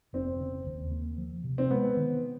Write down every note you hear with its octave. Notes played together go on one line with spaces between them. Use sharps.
F1 C4
C#3
D#2
A#3
F3
C3
C4
G#3 B3
D#3